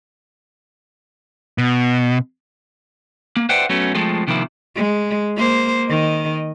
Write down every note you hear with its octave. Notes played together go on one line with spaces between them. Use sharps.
B2
A#3
B4 C5 D5 E5 F#5 G5
F#3 A3 B3 C#4
F3 G#3 A3 C4
C3 D#3 F3 A#3 E4
G#3
A#3 C5
D#3 D#5